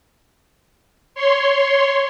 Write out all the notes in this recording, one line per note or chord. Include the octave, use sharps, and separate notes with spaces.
C#5 C6